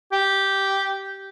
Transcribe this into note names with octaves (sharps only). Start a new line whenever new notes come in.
G4